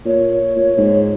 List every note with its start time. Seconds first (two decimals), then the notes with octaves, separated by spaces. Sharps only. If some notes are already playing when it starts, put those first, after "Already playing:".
0.05 A#2 C#5
0.56 A#2
0.78 G#2